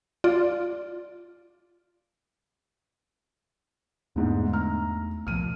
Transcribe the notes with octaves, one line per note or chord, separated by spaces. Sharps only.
F4 D5
E2 G#2 D3 A3 B3
A#5 F6
C2 A#2 F3 F6 D#7